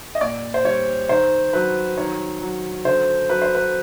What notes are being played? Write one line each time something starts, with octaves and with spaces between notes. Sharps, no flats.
D#5
A#2 D5
C5
G3 C#5
D#3 C5
F#3 B4
D#3 C#5
F#3
D3 C5
F#3 B4
C5
B4